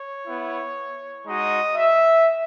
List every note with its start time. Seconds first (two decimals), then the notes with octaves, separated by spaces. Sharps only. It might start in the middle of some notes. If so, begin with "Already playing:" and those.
Already playing: C#5
0.27 B3 E4
1.26 G#3 D#4 F#4 D#5
1.75 E5